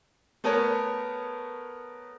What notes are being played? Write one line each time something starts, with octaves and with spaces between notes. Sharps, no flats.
A3 B3 A#4 C#5